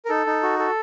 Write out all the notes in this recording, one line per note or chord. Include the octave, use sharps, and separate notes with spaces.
A#4
D#4 A4
D#4
F#4
A4